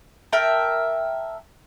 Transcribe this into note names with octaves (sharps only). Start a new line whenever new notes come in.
A#4 E5 G5 A5